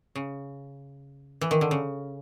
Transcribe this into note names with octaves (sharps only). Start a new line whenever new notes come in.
C#3
E3
D#3
D3
C#3